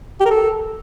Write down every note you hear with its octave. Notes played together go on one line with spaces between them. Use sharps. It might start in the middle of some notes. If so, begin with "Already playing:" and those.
G4
A#4
A4